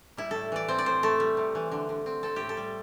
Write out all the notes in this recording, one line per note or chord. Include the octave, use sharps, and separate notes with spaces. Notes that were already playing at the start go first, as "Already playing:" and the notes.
G3 E4
A2 A4
E3 D5
C4 C5
D5
A2 C5
A3 A4
G3
C3
E3
D3
D3
C4
C4 A4
A2 G4
A4
G3